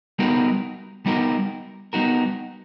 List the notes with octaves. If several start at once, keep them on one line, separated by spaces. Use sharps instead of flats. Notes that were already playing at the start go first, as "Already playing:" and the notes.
G3 B3 D#4 F#4 A#4
G3 B3 D#4 F#4 A#4
G3 B3 D#4 F#4 A#4